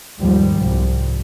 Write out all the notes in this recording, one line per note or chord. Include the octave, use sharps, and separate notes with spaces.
D#2 G#2 F3 G3
C2